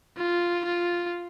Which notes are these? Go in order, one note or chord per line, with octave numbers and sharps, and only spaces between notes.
F4
F4